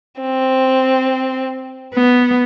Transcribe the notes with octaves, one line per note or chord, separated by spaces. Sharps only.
C4
B3